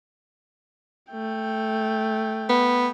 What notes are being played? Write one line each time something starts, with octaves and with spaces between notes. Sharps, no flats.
A3 G5
B3